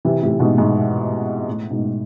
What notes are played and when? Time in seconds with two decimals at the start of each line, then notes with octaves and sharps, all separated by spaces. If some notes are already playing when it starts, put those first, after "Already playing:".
0.05 C3 E3
0.23 A2 C3
0.40 G#2 B2
0.58 G#2
1.47 A2
1.71 G#2 B2